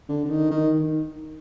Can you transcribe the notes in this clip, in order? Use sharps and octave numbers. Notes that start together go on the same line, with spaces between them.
D3
D3
D#3
D#3